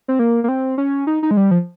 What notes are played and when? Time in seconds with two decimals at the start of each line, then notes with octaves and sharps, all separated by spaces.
0.08 C4
0.19 A#3
0.44 A#3
0.48 C4
0.78 C#4
1.07 D#4
1.23 D#4
1.31 G#3
1.37 G3
1.51 F3